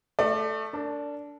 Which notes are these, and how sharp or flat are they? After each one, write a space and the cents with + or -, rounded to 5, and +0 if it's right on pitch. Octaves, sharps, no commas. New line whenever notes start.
A3 +0 D5 +30
D4 -15 A#4 -40